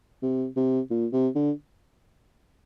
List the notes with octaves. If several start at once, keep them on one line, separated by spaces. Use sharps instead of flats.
C3
C3
A#2
C3
D3